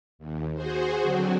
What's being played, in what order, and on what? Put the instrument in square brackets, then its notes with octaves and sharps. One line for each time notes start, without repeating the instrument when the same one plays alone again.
[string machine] D#2
F#4 G#4 C5
D3 F#3 C4